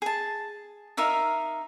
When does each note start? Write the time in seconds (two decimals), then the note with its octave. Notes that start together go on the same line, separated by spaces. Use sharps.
0.02 G#4 A5
0.97 D#4 A#4 E5 F5